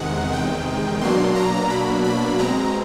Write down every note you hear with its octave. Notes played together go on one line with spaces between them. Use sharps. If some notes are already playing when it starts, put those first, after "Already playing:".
Already playing: E2 C3 D#3 G#3 F#5
G5
B2 F#3 A#3 D4 C6
A#5
B5
B5
B2 G#3 C4 A#5